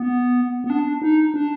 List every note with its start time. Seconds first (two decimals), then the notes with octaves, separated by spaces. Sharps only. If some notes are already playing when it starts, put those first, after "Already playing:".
Already playing: B3
0.64 B3
0.70 D4
1.02 D#4
1.34 D4